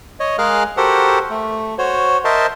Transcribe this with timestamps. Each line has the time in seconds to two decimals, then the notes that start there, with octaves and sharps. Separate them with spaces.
0.20 C#5 D#5
0.38 G#3 G#4 A#4 F5 F6 F#6
0.77 F#4 G4 A4 A#4 C5 F#5
1.30 A3
1.78 F#4 C5 C#5
2.25 A#4 C5 D#5 E5 A5 C6